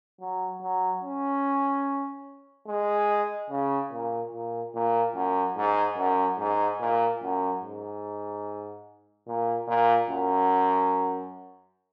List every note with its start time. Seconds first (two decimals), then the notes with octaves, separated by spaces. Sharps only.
0.20 F#3
0.61 F#3
1.03 C#4
2.68 G#3
3.50 C#3
3.92 A#2
4.33 A#2
4.74 A#2
5.15 F#2
5.57 G#2
5.97 F#2
6.38 G#2
6.80 A#2
7.21 F#2
7.63 G#2
9.27 A#2
9.67 A#2
10.10 F#2